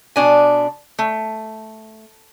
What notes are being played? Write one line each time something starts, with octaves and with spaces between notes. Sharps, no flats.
B2 D4 G#5
A3